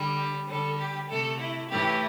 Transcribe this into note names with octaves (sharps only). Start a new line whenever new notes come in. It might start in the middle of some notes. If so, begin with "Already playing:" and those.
Already playing: D3 G3
G4
D3 G3 A4
G4
C3 A3 A4
E4
A2 E3 A3 G4